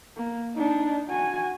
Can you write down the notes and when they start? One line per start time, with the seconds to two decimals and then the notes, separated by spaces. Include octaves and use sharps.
0.17 A#3
0.55 D4 D#4
1.08 F#4 G#5